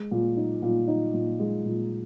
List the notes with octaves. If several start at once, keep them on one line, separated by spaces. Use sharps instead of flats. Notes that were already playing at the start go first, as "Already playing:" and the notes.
Already playing: G#3
A#2
D#4
A#2
D#4
A#2
G#3
A#2